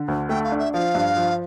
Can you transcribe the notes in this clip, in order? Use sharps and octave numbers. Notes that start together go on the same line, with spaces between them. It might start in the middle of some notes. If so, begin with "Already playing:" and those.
Already playing: D3
D2
A3 G5
F5
D4
E5
F3 F5
G2
F3